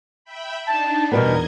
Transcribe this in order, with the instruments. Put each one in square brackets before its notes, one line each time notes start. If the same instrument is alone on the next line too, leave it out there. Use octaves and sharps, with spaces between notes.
[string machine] E5 G5 B5
[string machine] D4 D#4 [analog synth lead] A5
[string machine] E2 D#5 G#6 [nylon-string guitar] B2 G3 B3 [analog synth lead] A#4